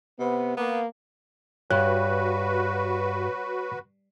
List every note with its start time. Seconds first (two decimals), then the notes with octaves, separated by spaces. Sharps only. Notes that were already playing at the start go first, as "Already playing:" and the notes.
0.19 C3 B3
0.57 A#3 B3
1.70 G2 F#4 B4 C#5 F#6